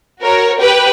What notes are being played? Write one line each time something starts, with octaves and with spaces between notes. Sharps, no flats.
F#4 A#4 C#5
G4 B4 G5